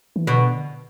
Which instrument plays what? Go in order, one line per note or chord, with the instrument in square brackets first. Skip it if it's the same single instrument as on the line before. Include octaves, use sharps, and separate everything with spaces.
[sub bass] E3
[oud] B2 [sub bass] D3